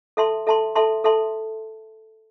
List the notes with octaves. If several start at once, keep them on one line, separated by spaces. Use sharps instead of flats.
A4 E5 A5 C6
A4 E5 A5 C6
A4 E5 A5 C6
A4 E5 A5 C6